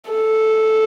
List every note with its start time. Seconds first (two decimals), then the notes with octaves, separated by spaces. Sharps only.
0.11 A4